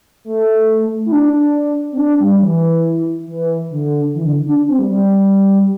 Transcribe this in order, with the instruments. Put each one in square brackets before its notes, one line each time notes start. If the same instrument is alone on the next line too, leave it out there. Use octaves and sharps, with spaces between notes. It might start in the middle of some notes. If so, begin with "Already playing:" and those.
[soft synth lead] A3
E4
D4
C4
D4
G3
E3
E3
D3
E3
D3
D4
C4
G3
G3